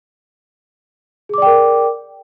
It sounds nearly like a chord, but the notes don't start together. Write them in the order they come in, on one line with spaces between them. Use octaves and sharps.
G#4 D6 D5 G5 A#4